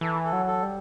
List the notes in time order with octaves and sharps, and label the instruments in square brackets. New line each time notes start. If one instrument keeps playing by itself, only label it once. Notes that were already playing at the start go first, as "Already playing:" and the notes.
[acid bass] E3 [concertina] A4
[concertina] A4
[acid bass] F#3
[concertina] A4
[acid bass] G3